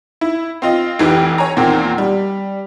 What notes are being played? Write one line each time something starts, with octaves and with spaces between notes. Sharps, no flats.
E4
C4 F4 D#5
F1 E3 G4 G5
C#5 G#5 A#5
E2 A#2 D#3 A#3 C4
G3